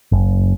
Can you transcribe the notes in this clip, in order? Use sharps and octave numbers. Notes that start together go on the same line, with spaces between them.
F#1